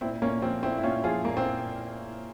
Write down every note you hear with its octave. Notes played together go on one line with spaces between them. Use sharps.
A#2 C4 E4
A#2 A#3 C#4
F3 C4
A#2 C4 E4
E4
A#2 C#4 F4
F3 F4 G#4
A#2 A#3
C4